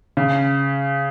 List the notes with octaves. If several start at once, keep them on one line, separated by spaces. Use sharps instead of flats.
C#3